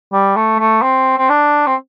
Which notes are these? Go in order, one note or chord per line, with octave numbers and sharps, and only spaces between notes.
G3
A3
A3
C4
C4
D4
C4